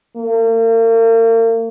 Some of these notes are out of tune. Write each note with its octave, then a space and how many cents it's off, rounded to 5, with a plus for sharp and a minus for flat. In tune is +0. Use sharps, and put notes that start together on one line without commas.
A#3 -40